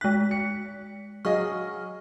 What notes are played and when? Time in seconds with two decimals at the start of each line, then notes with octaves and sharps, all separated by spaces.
0.01 G#3 F#6 B6
0.31 C#7
1.25 F#3 G#4 D#5 C#6 F6